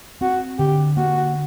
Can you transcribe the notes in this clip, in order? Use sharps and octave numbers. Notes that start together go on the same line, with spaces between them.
C4 F#4
D3 G4
A#3 F#4